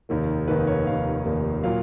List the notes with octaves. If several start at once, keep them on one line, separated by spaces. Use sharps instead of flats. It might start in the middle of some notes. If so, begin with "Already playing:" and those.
F1 D#2 D#3 A#3
F1 D#2 D#3 A#3 B4
C#5
F1 D#2 D#3 A#3 F5
F1 D#2 D#3 A#3
A#2 F#3 A#3 F5